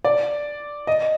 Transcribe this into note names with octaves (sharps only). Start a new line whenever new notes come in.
D5
D#5